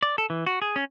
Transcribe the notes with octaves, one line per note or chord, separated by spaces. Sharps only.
D5
A4
E3
F#4
G#4
C#4